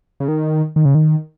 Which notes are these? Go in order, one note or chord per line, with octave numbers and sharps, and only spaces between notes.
C#3
D#3
D#3
C#3
D#3